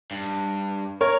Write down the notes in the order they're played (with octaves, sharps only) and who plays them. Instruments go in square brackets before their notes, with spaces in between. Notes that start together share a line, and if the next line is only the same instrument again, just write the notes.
[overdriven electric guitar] G2
[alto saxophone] A#4 [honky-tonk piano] C#5